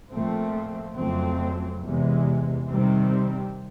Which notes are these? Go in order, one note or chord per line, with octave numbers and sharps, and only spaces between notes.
A#2 F3 A3 C4
F2 C#3 F#3 A3 C4
E2 C3 E3 G#3
C3 D#3 G3 C4